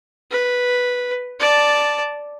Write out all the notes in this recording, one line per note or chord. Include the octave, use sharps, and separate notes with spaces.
B4
D5 A5